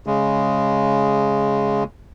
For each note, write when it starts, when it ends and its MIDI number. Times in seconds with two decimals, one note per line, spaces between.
0.06 1.84 49
0.06 1.84 56